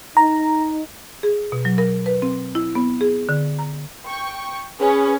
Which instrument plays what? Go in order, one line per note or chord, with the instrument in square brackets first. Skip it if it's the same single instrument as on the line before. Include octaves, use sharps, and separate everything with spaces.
[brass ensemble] D#4 [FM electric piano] A#5
[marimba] G#4
B2
F#3
A#4
B4
C4
E4
B3
G#4
D3
A#5
[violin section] G5 C#6
[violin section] C#4 B4 [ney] G#4